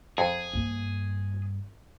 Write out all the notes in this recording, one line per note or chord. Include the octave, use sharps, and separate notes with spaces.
F2 G#4
G2 A#3